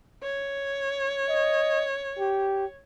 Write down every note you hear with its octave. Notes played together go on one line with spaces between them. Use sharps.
C#5
D#5
G4